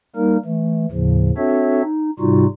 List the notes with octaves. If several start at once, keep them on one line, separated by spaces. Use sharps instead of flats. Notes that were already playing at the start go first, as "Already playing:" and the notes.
G3 A#3 D#4 A#4
E3 A3
D#2 A2 C#3 F3
C4 D4 F#4 A4 C#5 E5
D#4
G#2 C3 G3 D#4 F4 F#4